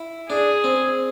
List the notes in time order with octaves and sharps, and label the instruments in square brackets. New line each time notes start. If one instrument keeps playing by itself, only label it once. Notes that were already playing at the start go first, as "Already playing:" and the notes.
Already playing: [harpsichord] E4
[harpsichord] D4 [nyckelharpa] G#4
[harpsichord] C4